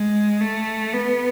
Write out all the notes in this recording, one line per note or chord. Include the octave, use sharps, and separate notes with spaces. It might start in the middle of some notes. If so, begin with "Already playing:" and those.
Already playing: G#3
A3
B3